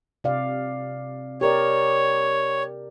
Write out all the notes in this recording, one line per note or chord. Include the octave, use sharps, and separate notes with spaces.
C3 D5 F5
G4 A#4 C#5 D5